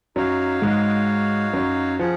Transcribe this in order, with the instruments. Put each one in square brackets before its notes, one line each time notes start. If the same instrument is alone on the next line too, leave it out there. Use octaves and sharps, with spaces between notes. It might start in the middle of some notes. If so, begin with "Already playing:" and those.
[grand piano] F#2 F#3 [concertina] D#4 F#4 C#5 F5
[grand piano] G#2 G#3
F#2 F#3
[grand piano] F3 [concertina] C#4 G#4 C#5 F#5